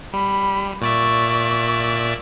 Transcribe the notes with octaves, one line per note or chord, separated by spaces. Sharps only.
G3 B5
A#2 D5 E5 C#6